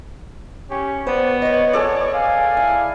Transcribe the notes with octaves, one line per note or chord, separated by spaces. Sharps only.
C#4 G4
B3 C5 D5
B4 C#5 D#5
G#4 A4 D5
F5 G#5
E4